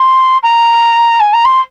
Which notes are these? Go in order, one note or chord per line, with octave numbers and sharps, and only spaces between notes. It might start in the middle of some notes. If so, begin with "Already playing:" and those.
Already playing: C6
A#5
G#5
A#5
C6